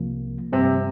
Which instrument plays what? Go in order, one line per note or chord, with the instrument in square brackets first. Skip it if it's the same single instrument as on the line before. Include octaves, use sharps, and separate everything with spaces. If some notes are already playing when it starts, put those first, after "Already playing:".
Already playing: [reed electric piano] C2 C3 F3 A#3
[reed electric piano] G2 G3 C4 [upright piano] C3